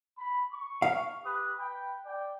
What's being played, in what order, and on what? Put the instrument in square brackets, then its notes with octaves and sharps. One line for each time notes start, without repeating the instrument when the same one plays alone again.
[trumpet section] B5
C#6
[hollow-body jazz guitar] F5
[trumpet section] G4 B4 D#6
B4 G5
D5 G5